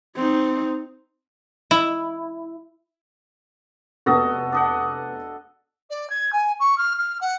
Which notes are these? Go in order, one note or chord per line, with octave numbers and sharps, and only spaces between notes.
C4 D#4
E4
F1 B3 F#4 A4 D#5 A#6
D4 D#5 F#5
D5
G#6
G#5
C#6
F6
F6
F#5